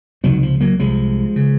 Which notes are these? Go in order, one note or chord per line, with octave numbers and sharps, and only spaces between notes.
C#2 C3 D#3 F#3
F3
F#3 A#3
C2 C3 F3 G#3
C#3